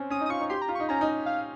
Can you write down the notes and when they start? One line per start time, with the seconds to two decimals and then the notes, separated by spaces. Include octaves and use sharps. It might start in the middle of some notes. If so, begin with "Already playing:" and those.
Already playing: C4 C#4
0.10 C#4 D#6
0.20 D#4
0.26 D#6
0.29 F4 C#6
0.40 D#4
0.49 G4 C6
0.62 A#5
0.69 F4
0.75 C#6
0.80 D#4
0.89 C#4 A#5
1.01 D#4
1.26 F5